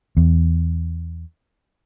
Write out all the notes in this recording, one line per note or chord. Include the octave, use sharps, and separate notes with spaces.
E2